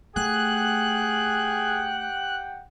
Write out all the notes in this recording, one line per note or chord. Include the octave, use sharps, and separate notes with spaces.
A3 G4 G#4 F#5 G5 F#6